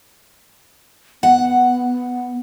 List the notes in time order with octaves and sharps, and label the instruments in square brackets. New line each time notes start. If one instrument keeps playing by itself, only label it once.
[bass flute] B3 [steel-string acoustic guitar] F#5